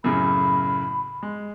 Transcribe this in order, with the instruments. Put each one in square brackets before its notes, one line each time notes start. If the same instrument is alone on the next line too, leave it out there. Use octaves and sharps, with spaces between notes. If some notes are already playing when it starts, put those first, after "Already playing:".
[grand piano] F#2 A2 C#3 [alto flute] B5
[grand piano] G#3